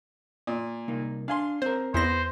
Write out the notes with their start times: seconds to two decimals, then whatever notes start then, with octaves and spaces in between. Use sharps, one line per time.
0.47 A#2
0.88 C2 A#3 D#4
1.28 D4 F5 G#5 C6
1.62 C4 A#4 C5
1.94 E2 B3 E4 C5 A#6